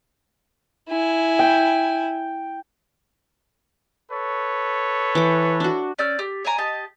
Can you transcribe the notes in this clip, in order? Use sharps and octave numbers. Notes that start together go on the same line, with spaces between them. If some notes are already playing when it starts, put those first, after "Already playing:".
E4 G#5
G5
A4 B4 C#5
E3 G5 D6
D4 F#4
C#4 D5 E6 G6
G4
C#5 D5 G#5 A#5
G4 D#5 A5